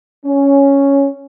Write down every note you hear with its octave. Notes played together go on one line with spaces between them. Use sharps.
C#4